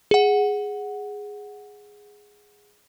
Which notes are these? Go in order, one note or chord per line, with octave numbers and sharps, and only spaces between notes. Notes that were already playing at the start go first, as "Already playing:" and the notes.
G#4 F#5